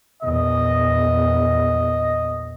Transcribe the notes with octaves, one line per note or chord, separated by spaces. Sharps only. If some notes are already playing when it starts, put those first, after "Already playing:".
A#1 E2 D#5